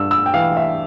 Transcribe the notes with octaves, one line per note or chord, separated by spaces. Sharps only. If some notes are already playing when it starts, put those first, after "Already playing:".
Already playing: G2 E6
E6
G5
E3 F5
E5